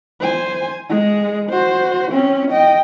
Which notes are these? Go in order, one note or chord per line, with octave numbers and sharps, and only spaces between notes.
C5 G#5
G#3 G#4
F#4 C5
C4 C#4
D#5 G5